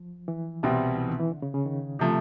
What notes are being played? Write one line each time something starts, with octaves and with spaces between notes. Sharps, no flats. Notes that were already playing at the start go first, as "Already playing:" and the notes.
Already playing: F3
E3
C2 B2 G3 C4
E3
D#3
E3
D3
C#3
C#3
D#3
C3 F3 A3